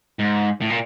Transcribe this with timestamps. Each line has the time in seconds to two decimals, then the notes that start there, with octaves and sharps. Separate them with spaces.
0.19 G#2
0.61 A2
0.70 A#2